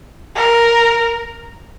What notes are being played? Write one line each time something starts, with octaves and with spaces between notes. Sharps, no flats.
A#4